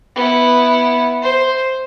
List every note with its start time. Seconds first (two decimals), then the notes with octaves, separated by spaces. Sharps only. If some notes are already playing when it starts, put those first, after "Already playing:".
0.16 B3 E4
1.22 C5